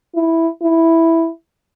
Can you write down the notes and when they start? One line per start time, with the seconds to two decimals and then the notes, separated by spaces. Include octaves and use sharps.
0.14 E4
0.62 E4